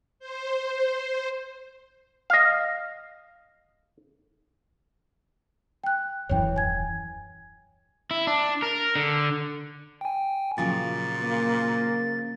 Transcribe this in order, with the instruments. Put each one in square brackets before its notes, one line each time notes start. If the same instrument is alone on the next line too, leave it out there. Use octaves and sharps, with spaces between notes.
[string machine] C5
[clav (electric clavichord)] D#5 F5
[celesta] G5 F#6
[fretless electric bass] D#1 F#2 E3 [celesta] C#5 G5
[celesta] G#5 G#6
[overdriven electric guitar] E4
D4
A#4
D3
[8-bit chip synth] G5 G#5
[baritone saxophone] A#2 [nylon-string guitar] C#3 F3 F#3 [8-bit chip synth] A6
[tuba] A#3